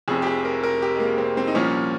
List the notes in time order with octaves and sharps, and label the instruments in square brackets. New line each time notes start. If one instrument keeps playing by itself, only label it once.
[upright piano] F1 F2 C3 G#4
G4
G#4
A#4
A#4
G4
G#3
A#3
C4
C4
D#4
C2 A#2 F3 C#4